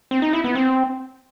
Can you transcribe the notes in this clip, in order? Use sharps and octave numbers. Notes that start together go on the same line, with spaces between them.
C4
D#4
E4
B3
C4